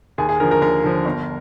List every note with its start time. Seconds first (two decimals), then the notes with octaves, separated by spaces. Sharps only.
0.18 D#2 G#4
0.29 G#4
0.40 D3 A#4
0.43 F3
0.51 A#4
0.61 D#2 A#4
0.84 D3 F3
1.05 G1